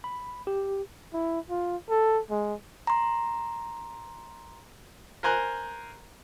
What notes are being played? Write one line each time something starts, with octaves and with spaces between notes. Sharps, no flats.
B5
G4
E4
F4
A4
G#3
A#5 C6
A#4 C5 G#5 A#5 F#6